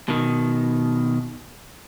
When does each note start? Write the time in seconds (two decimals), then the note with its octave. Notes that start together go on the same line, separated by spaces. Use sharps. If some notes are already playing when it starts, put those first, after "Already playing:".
0.08 B2 D#3